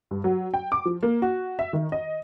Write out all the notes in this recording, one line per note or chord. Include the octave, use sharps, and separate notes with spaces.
G2
F#3
G5
D6
F3
A#3
F#4
E5
D#3
D#5